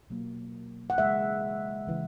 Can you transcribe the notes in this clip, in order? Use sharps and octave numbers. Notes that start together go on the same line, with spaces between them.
B2 F#3 A#3
F#5
C#3 E3 G#3 E5
C#3 E3 G#3